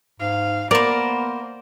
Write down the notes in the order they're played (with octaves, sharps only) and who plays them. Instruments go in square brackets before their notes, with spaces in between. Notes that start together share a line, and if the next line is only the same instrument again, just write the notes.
[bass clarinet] G#2 [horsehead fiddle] F5
[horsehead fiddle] A#3 [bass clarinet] B3 [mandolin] A#4 C5 [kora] D5